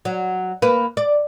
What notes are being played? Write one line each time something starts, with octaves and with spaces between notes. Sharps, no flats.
F#3
A#3 B4
D5